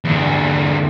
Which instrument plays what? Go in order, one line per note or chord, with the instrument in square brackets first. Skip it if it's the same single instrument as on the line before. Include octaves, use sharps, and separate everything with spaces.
[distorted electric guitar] E2 D3